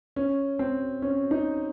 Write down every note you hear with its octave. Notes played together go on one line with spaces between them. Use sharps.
C#4
C4
C#4
D#4